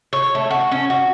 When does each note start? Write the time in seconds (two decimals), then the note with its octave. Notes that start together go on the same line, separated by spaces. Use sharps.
0.13 C#5
0.35 A3
0.50 F#4
0.72 C#4
0.90 F#4